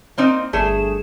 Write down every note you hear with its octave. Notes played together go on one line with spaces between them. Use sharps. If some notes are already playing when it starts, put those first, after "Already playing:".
A#3 C4 D#4
G1 A3 G#4 E7